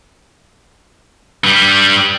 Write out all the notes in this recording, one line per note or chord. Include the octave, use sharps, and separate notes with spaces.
G2 G3